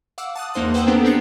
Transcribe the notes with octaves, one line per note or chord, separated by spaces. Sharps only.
F5 F#5 D6 E6
A5 D#6 F#6
E2 A#3 D#4 C5 C6 D#6
B4 C5 F#5 G5 A#5 E6
B3 C4 D4 G4 A4
B3 C4 G5 C7 C#7